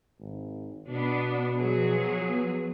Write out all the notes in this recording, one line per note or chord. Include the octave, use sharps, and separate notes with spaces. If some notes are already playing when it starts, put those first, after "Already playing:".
G#1
B2 B3 D4
F3 F#3 G#4
B3